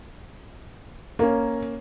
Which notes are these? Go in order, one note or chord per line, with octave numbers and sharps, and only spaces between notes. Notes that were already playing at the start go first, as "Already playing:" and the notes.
A#3 C#4 A#4